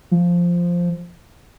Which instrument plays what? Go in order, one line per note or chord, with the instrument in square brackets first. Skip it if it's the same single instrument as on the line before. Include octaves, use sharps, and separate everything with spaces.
[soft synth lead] F3